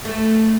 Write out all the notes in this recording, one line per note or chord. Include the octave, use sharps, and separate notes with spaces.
A3